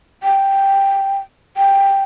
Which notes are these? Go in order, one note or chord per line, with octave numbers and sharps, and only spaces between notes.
G5
G5